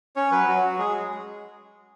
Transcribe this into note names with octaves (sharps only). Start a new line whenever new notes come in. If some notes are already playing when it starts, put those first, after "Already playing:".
C#4 C#5
F#3 B4
F#3 F#4
F#3
G#3 G#4